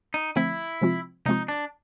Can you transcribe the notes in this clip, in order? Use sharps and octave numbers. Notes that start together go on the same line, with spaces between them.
D#4
D3 F3 A3 C4 E4
C3 F3 G#3 C4 F4
C3 F3 G#3 C4 D#4 F4
D4